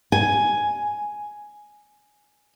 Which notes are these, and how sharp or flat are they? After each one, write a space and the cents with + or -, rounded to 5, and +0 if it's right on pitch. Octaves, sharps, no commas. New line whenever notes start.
G#5 +5